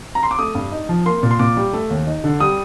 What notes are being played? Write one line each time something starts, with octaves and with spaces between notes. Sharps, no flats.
A#5
C6
D6
A3 D#6
G2
D#4
F3
A#3 C6
A#2
C6
A#2 D6
G3
A3
D#2
D#4
D3
G3 D#6